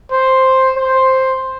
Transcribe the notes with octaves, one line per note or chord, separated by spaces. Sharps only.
C5
C5